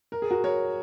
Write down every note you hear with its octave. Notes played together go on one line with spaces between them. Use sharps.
A#4
G#4
F#4 A#4
A#4 C#5